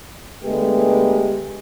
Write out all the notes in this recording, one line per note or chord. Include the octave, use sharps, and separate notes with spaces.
D3 G#3 A3 B3 G4 B4